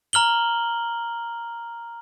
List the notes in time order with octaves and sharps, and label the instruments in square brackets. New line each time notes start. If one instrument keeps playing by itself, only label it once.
[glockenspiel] A#5 F6 F#7 G7